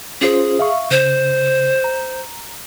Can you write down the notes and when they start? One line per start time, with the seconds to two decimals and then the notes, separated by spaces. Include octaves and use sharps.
0.21 C#4 F4 G#4 C5
0.59 E5 F5 C#6
0.91 C#3 C5
1.84 A#5